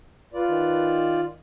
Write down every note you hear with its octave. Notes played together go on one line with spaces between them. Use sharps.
F4 B4 D5
D#3